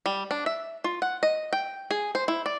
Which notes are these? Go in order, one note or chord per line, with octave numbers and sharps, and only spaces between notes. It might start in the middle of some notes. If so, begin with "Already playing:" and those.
G3
D4
E5
F4
F#5
D#5
G5
G#4
C5
E4
D5